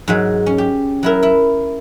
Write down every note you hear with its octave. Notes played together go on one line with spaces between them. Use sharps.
G#2 F#3 G#3
C#4
G4
F#3 E4 A#4
E4